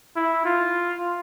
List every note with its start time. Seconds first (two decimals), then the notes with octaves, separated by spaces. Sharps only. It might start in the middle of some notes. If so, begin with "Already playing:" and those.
0.16 E4
0.45 F4